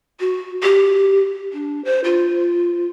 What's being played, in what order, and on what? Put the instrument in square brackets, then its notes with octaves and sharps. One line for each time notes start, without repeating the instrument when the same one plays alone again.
[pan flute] F#4
G4
D4
C5
F4